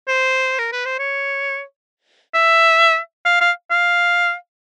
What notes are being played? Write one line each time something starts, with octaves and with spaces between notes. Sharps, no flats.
C5
A#4
B4
C5
C#5
E5
F5
F5
F5